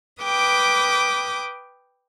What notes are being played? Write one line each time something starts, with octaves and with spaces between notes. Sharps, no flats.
B4 G5 D6 D#6